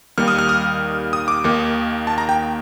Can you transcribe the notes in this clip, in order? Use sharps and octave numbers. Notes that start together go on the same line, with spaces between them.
D#2 D#3 G3 A#3 F6
D#6
F6
D#6
D#6
D6
D#2 D#3 A#3
A5
A#5
G5